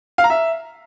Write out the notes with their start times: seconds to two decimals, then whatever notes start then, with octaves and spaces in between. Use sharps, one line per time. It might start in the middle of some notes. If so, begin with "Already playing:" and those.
0.18 F5
0.24 A#5
0.30 E5